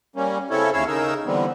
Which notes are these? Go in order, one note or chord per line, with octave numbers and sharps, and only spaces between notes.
G3 A#3 C#4
C#3 C4 C#4 E4 A4 C#5
D#2 C#4 E4 C#5 F5 E6
C#3 D#4 A#4 E6
D3 E3 G3 B3 C4